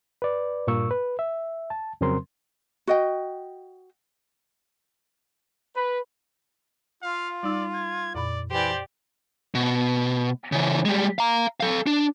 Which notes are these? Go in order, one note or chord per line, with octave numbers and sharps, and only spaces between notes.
B4 D5
G2 A#2 A#3 C#6 E6
B4
E5
A5
F2 C#3 F#3 C4 A#4 C6
F#4 D#5 G5
B4
F4 F5
G3 D#4 D5 E6
G#6
F2 A#2 D5 B5
E3 G4 C5 D5
B2
C#3 E3
G3 G#3
F5 A#5
A4 F5
D4